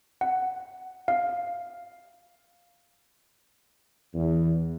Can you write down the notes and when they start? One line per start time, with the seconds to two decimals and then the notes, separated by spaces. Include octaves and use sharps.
0.21 F#5
1.08 F5
4.14 E2